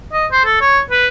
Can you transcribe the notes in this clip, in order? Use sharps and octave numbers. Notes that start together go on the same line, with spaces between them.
D#5
C5
A4
C#5
B4